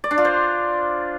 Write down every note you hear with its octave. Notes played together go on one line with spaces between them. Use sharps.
D5
D4
F4
C5